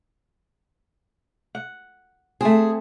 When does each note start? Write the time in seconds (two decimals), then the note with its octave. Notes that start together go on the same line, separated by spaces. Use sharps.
1.55 F#5
2.41 A3 C4 G#4